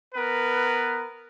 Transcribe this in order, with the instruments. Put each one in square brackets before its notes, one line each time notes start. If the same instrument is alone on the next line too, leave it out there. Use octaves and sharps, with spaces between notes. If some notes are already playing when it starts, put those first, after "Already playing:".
[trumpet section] B3 A#4 B4